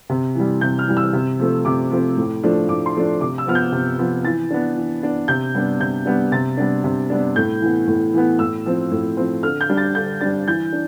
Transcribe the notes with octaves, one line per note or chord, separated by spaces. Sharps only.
C3
E3 G3
C3 G6
F6
E3 G3
E6
C3
F3 A3 C4
C3 D6
F3 A3 C4
A2
F3 A3 D4
A2 D6
C6
F3 A3 D4
C3 D6
E6
F3 B3 F6
G6
C3
F3 B3
E3 A6
B3 D4
E3
B3 D4
C3 G6
G3 B3 D4
C3 G6
G3 B3 D4
C3 A6
G3 B3 D4
C3
G3 B3 D4
A2 G6
E3 B3
A2
E3 B3
A2 E6
F3 C4
A2
F3 C4
D3 F6
G6
G3 D4
A6
D3 G6
G3 D4 A6
E3 G6
D4